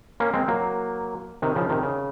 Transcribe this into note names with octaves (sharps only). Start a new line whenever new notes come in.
A#3 C#4
G#3 C4
F#3 A#3
C3 D#3
C#3 F3
C3 D#3
C#3